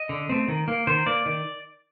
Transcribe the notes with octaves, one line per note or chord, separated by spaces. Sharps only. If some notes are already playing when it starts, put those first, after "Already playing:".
Already playing: D#5
D3
A3 C4
D#3
A#3
D#3 C5
A#3 D5
D#3